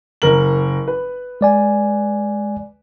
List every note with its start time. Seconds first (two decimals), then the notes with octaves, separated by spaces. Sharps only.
0.22 F#1 A#4 F#7
0.88 B4
1.41 G#3 D5 G#5